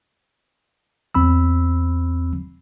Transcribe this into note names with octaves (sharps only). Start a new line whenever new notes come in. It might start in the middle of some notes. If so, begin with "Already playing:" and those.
E2 C4 B5 E6